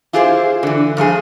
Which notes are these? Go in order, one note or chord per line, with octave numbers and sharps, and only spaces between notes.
E4 F4 G4 G#4 B4 C5
D3 E3
G2 F3 A3 G#4